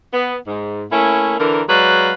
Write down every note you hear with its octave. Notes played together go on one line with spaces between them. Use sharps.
B3
G#2
A3 A#3 C#4 E4
D3 E3 A#4
F#3 G#3 B4 D5 F5